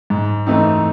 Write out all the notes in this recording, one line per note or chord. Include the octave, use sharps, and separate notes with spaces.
G#2
E3 A3 C4 D#4